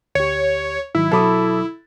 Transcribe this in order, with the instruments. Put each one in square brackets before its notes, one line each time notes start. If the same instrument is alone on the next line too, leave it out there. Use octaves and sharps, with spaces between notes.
[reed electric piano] D2 G4 [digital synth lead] C#5
[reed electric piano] G#2 D#3 F#3 [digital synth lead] E4
[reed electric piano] B2 F#3 D6 [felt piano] A4 B5 D#6